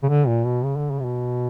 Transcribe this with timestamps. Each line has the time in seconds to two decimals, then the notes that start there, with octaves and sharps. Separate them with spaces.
0.03 C#3
0.09 D3
0.27 A#2
0.45 B2
0.64 C#3
0.77 D3
0.91 C#3
0.99 C3
1.05 B2